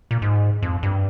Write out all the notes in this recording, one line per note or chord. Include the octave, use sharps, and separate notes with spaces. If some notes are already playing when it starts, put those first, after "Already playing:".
A#2
G#2
F2
G2